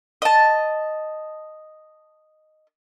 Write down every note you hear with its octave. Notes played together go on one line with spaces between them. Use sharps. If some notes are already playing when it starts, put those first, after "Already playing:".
D#5 A5